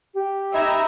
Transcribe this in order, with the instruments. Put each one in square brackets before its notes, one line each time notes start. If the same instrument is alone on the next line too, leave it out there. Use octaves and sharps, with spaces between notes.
[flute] G4
[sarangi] D#4 [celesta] D#5 B5 G#6 [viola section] E5 A#5